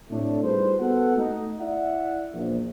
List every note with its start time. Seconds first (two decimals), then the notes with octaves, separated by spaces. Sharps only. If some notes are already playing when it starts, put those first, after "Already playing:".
0.10 A2 C3 A3 D4
0.44 G3 D#4 F4 G#4 B4 C5
0.80 B3 F#4 A4 F#5
1.16 A3 D#4
1.60 E4 D5 E5 F#5
2.33 A#1 E2